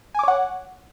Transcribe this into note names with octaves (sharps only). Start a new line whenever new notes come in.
C#5 F#5 G#5 D6